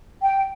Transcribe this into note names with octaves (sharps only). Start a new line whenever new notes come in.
G5